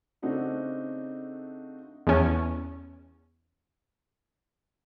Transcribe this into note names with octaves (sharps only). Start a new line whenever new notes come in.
C#3 A3 C4 D4 D#4 F#4
E2 C#4